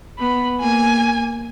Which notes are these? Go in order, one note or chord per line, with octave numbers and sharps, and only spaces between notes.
B3 B5
A#3 G#5